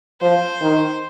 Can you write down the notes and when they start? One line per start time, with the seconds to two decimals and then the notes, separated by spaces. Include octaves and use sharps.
0.21 F3 C5
0.61 D#3